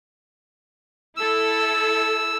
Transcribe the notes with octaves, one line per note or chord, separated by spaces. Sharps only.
E4 A4 E6